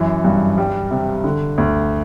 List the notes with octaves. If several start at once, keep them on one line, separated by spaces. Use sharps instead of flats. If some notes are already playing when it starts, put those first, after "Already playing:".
Already playing: F#2 E3
G2
G3
C3
D3
D2